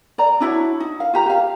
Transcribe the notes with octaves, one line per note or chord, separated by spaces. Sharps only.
D5 A#5
D4 E4 F#4 C#5
D#4
F5
F4 G4 A#5
G4 F5